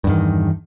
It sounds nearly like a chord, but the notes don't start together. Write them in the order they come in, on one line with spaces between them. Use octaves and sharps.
G2 E2 D#3